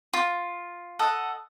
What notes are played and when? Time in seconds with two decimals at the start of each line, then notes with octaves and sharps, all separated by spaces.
0.13 F4
0.99 A4 D#5 F#5